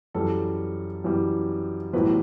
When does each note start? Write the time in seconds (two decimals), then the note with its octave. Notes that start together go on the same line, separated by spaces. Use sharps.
0.15 F#2 E3 G3 A4
1.04 F#2 E3 G3
1.93 B1 A2 E3 G3 B4